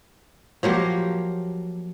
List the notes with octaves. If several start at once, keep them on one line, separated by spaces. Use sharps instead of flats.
F3 F#3 A#3 G4